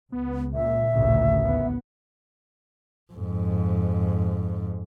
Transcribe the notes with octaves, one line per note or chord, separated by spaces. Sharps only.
C#2 B3
A#2 E5
A1 D2 C#3
D#2 B3
F2 G#2